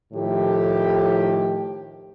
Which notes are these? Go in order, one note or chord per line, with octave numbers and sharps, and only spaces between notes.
A2 D#3 F3 A3 G4